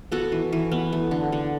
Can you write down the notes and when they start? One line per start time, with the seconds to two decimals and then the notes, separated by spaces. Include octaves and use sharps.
0.12 B3 F#4 A4
0.32 E3
0.53 E3
0.71 B3
0.93 A3
1.11 D3
1.32 D3